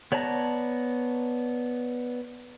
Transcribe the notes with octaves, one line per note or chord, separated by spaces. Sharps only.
B3 C#5 D5 A5 A#5